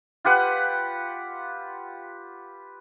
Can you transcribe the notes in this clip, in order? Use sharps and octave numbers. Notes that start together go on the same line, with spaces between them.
F4 G4 B4 F#5